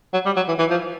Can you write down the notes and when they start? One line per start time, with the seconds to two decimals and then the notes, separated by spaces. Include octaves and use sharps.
0.13 F#3
0.26 G3
0.36 F#3
0.48 E3
0.59 E3
0.70 F3